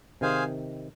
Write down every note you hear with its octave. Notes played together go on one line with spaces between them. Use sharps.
C3 D#3 G#4 C5 F5 G#5